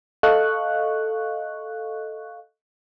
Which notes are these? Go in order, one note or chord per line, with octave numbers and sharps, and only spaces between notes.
A4 D#5 F5 C#6 F#6